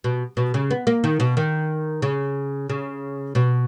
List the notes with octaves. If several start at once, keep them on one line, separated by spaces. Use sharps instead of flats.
B2
B2
C#3
B3
A#3
D#3
B2
D#3
C#3
C#3
B2